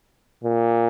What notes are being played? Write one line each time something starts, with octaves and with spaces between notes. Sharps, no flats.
A#2